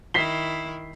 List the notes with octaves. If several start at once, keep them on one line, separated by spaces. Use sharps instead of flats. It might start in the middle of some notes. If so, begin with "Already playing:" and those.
D#3 E4 B6 C7 G7